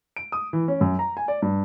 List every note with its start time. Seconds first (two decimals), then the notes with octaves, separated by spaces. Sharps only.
0.16 D7
0.32 D#6
0.53 E3
0.68 C#4
0.81 F#2
0.99 A#5
1.17 G#5
1.28 D5
1.42 G2